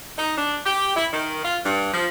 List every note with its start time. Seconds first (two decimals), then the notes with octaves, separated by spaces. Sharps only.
0.18 D#4
0.38 D4
0.66 G4
0.97 E4
1.13 D#3
1.45 F4
1.65 G2
1.93 F3